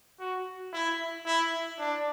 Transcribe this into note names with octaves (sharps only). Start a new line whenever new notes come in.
F#4
E4
E4
D4